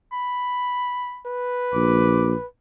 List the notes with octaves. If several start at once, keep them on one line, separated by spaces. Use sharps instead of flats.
B5
B4
A#1 D6